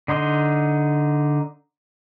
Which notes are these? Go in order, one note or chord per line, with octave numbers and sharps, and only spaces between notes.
D3 D#4 C6